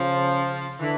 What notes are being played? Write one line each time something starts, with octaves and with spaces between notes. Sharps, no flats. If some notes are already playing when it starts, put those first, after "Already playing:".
Already playing: C#3 F3
D3 E3